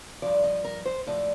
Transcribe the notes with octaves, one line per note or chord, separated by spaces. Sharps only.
G2 F3 D5
D#5
A#4
C5
A2 F3 D5